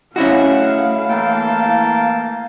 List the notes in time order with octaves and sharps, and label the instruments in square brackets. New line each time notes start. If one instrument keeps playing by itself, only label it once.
[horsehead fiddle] A3 F5 [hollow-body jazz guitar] C#4 E4 F#4 [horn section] G#4 D#5 F#5
[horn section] E3 G5 A5 [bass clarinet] A#3